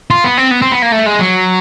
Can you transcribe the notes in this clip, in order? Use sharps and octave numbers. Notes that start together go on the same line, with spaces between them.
F4
B3
C4
B3
C4
B3
A#3
A3
G#3
F#3